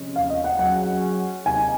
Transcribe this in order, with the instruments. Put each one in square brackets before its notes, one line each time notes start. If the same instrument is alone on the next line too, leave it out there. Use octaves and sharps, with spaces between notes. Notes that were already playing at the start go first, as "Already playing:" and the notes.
Already playing: [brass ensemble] C3 F3 G#3 C#4
[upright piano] F5
D#5
F#5
[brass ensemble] F#3 C#4 G#4 [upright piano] F#5
[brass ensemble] C3 D#3 A#3 D#4 [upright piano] G#5